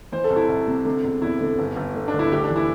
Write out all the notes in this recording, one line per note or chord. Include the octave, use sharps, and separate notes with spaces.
E3 C5
A4
C2
E4
C2
C3
D3
E1
E2 E4
D3
G1
G1
D3
D4
D3
E4
D2 G4
D4
E3
E4